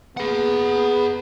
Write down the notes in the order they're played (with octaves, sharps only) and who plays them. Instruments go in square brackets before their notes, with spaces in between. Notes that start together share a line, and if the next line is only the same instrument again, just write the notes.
[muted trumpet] B3 [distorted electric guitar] G#4 F#5